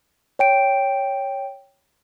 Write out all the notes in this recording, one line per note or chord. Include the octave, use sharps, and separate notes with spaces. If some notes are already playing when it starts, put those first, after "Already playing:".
C#5 G5 D7